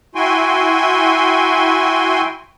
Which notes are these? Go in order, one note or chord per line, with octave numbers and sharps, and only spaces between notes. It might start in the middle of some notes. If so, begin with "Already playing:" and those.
E4 F#4 G5 G#5 C6